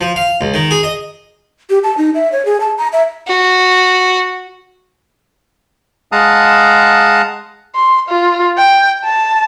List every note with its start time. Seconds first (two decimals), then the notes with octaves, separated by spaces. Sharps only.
0.01 F3
0.16 F5
0.41 C#2
0.54 D#3
0.71 G#4
0.83 D#5
1.70 G4
1.84 A5
1.97 D#4
2.14 E5
2.32 C#5
2.45 G#4
2.60 A5
2.78 A#5
2.93 E5
3.27 F#4
6.12 G#3 F5 F#5 A5 A#5 D#6
7.75 C6
8.09 F4
8.58 G5
9.05 A5